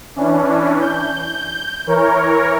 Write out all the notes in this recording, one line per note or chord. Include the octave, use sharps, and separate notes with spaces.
E3 C#4 D4
G6
E3 A#4 C#5